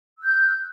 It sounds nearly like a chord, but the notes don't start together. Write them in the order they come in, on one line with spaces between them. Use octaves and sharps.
E6 F#6 G6